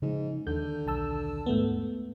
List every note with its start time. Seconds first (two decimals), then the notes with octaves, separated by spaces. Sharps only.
0.02 G#2 C#3 F3 G#3
0.47 D#2 D3 G6
0.87 B1 A5 E6
1.46 G#2 A3 B3